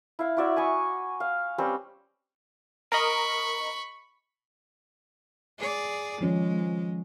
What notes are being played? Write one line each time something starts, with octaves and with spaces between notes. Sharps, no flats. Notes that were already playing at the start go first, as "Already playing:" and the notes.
E4 F5
E4 F#4 D5 E5
G#5 B5 C#6 D#6
F5
G3 C4 C#4 B4
A#4 D#5 B5 C#6
G#4 D5
D#3 F3 G#3 C#4